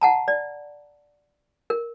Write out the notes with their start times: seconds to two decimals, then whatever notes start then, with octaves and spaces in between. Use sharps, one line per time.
0.01 F#5 A5 A#5
0.28 D5
1.70 A#4